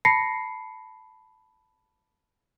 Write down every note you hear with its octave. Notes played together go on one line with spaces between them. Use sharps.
A5 B5 A#6 C7 C#7